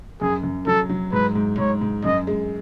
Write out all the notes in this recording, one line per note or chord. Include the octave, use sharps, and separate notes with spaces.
F#2 G#4
F#2
F#3 A4
F#3
G#2 B4
G#2
G#2 C#5
G#2
F#2 D#5
G#3